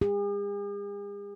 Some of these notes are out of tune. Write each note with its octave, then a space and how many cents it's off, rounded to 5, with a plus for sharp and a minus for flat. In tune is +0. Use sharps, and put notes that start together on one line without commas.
G#4 -45